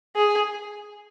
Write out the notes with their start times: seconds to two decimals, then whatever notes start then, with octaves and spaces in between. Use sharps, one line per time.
0.16 G#4